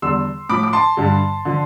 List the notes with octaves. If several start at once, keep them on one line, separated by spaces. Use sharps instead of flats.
E2 D3 G3 C6 E6
A2 F3 B5 D6
D6
A5 C6
G2 D3 G3
D3 F3